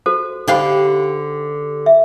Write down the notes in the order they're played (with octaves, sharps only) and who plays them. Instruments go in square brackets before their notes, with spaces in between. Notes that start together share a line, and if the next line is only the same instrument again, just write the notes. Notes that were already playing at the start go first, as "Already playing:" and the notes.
[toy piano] F#4 A4 C5
[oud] D3 G4 F5 [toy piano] D#4 C5 B5
[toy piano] E5